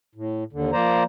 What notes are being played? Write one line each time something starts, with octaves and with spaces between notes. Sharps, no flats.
A2
D#2 D3
F3 A#3 C5 D5 A#5